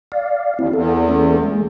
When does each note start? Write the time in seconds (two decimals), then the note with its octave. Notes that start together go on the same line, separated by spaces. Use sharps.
0.12 D5 F5
0.59 D#2 C4 E4
0.73 E2 A4
1.09 A#3 C#4 A4
1.43 G#3